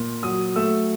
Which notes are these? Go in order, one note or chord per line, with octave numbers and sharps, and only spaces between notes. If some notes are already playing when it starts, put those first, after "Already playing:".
Already playing: A#2
F#3 D#6
A3 E6